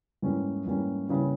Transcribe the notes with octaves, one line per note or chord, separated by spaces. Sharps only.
G#2 E3 G3 A#3 C#4
G#2 E3 G3 A#3 C#4
C#3 E3 G3 A#3